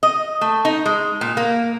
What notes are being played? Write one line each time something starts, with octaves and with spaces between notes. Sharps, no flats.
D#5
A3
D#4
G#3
A#2
A#3